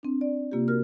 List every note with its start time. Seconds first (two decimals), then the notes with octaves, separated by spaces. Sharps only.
0.03 C4 D4
0.21 D5
0.52 C3 A#3 F4 G4
0.68 F#4 A#4 F6